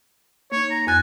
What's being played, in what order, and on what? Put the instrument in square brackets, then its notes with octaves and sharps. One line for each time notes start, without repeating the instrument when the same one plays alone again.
[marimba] A#3 D#4 [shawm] C#5
[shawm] A#5
[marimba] F2 F#6 A6 [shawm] G#5